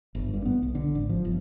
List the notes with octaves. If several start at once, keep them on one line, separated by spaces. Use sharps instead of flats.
G1
G2
B3
B1
D3
G#1
F3
G1